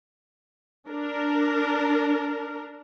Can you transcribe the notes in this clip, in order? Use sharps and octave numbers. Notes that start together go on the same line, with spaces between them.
D4 A#4